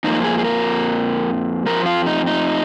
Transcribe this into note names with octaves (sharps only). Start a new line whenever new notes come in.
F2 F3 A#3 D#4
G#4
G#4
A#4
F2 F3 A#4
F4
D#4
D#4